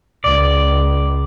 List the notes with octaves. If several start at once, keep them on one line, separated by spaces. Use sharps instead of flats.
C#2 D5